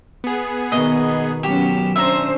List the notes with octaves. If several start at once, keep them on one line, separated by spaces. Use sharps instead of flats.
B3 G#4
B2 D#3 D#5
F#3 B3 C#4 G4 E7
C#4 D4 C5 E5 A#5